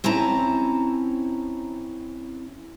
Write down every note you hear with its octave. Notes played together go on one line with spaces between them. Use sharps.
C4 C#4 E4 A5 A#5